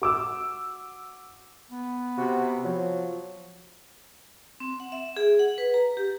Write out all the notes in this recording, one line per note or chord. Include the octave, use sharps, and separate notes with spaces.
F#4 D6 E6
B3
C3 F#4
F3 F#3
C4
F#5
E5
G#4
F#5
B4
A#5
G4